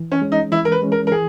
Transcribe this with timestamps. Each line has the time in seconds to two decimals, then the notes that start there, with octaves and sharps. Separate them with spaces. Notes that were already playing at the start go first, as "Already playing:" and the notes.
Already playing: E3
0.12 C#4
0.22 G#3 C#4
0.32 D#4
0.52 E3 E4
0.65 A#4
0.72 B4
0.82 G#3 C#4
0.92 A#4
1.07 A#4
1.12 E3 G#4